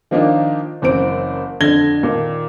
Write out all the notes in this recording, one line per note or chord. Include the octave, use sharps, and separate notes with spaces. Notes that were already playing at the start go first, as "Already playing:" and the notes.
D#3 F3 A#3 D4 D#4 F4
F#1 F#2 E3 C4 C5 D7
F2 D3 G#6 A#6 G7
A#2 D#3